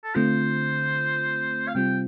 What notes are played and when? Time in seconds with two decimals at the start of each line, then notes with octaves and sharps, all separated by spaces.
0.04 A4
0.15 D3 A3 C4 F4 C5
1.68 F5
1.75 C3 G3 C4 F4 G5